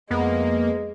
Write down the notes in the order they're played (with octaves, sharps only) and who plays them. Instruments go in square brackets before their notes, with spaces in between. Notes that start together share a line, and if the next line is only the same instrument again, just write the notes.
[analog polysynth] F2 A#3 [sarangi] G#3 [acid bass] B3